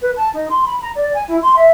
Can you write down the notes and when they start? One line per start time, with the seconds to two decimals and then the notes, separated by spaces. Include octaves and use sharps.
0.02 B4
0.16 A5
0.34 D#4
0.50 C6
0.66 B5
0.82 A#5
0.95 D5
1.14 G#5
1.28 E4
1.42 C6
1.56 E5